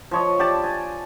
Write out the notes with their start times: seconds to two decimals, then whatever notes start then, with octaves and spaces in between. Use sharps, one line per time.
0.11 F3 C#5 D#5
0.39 G4 D5 A5
0.63 G#5